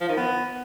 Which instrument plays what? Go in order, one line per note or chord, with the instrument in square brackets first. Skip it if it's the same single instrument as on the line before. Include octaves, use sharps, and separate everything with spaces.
[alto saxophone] F3
D#3
B3